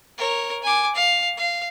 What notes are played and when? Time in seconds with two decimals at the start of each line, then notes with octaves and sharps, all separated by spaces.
0.18 A#4 C#5
0.63 G#5 D6
0.95 F5
1.37 F5